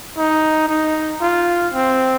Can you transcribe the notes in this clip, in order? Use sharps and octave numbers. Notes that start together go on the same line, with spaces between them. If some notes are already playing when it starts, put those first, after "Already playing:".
D#4
D#4
F4
C4